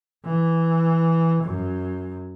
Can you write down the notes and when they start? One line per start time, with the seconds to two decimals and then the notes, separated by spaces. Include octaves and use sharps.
0.25 E3
1.43 F#2